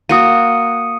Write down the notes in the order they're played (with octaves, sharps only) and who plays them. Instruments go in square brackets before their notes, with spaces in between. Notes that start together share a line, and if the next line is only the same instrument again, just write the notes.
[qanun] A#3 F#4 [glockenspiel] D#6 C#7 D#7